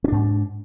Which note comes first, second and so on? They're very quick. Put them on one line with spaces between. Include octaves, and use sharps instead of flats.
C#4 D4 G#2